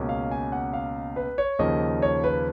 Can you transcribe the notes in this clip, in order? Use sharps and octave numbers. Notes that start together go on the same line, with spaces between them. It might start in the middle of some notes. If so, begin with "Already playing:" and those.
Already playing: C#2 B2 A#3 C#4
F5
G#5
F#5
F5
B4
C#5
D#2 C#3 F3 A#3 D#5
C#5
B4